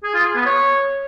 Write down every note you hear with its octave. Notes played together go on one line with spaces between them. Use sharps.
G#4
F4
G#4
B3
C#5